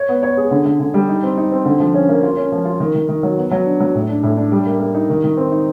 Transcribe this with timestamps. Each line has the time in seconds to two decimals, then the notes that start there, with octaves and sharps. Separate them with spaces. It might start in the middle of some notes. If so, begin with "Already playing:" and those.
Already playing: C#5
0.09 B3
0.23 C#5
0.37 G#4
0.51 D3
0.65 D3
0.80 D3
0.94 G3
1.09 D#4
1.23 C4
1.38 D#4
1.52 C4
1.65 D3
1.80 F3
1.94 C#4
2.09 A#3
2.23 F4
2.37 C#4
2.52 F3
2.65 F4
2.80 D#3
2.95 D#3
3.09 D#3
3.23 F#3
3.38 B3
3.51 F#3
3.66 D4
3.80 F#3
3.95 A2
4.09 D4
4.23 A2
4.37 D4
4.52 G3
4.66 A#3
4.80 A#3
4.95 D#4
5.10 D#3
5.24 D#3
5.37 C4
5.52 D#4